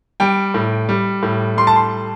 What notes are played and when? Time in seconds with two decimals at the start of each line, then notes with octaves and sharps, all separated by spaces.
0.20 G3 G5
0.54 A2
0.89 G3
1.23 A2
1.57 G3 C6
1.67 A5
1.76 C6